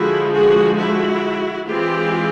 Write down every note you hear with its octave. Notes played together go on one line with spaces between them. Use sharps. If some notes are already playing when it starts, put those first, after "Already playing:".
Already playing: D3 F3 G#3 E4 F#4
F#4 G#4
E4 F#4
E3 G#3 C4 F4 G4